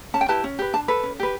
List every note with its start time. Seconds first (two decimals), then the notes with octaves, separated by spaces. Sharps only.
0.14 C#4 A5
0.21 G5
0.29 E4 G4 B4 A5
0.44 C#4
0.59 G4 B4
0.73 D4 A5
0.88 A4 B4
1.03 C#4
1.20 G4 B4